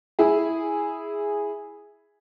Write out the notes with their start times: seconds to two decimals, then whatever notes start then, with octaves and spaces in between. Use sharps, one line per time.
0.19 E4 G#4